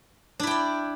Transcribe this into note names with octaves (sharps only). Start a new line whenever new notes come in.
D4 E4 D5 G5